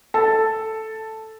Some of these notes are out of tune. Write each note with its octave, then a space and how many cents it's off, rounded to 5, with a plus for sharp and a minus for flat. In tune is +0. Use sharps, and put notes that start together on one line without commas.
A4 +0 A5 +0